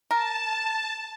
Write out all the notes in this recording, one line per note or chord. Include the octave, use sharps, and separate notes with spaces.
A#4 A5